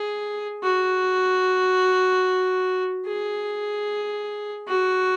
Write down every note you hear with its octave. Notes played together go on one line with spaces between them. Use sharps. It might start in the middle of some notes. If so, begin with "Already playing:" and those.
Already playing: G#4
F#4
G#4
F#4